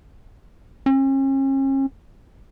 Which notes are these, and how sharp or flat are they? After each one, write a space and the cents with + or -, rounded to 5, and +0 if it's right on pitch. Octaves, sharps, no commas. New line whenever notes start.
C#4 -40